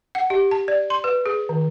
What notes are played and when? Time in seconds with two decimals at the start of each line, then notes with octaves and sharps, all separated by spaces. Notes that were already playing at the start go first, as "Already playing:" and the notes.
0.15 F#5
0.30 G4
0.51 A5
0.68 D5
0.90 C6
1.04 B4
1.26 G#4
1.49 D#3